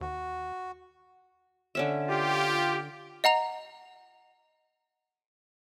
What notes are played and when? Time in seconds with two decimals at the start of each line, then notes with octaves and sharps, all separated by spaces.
0.01 D#2 F#4
1.75 D3 C#4 E5
2.09 F4 G4
3.24 D#5 F#5 A#5 F7